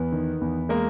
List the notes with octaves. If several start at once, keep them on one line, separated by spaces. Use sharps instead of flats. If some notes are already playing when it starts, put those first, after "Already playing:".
Already playing: E2 B3
D#3
E2
G#3 A#3